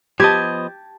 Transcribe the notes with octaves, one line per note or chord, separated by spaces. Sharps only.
F3 B3 G4 D#5 A5 G#6